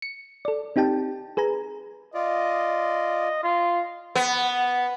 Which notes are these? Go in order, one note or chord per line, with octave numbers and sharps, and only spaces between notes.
C#7
A4 D5
C4 D#4 G4 G5 A5
G#4 B4 G#5 A#5
F4 D5 D#5
F4
B3